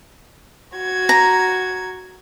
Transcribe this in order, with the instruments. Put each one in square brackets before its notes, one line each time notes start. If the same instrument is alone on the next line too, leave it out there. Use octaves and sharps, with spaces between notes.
[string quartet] F#4 G#6
[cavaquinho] A#5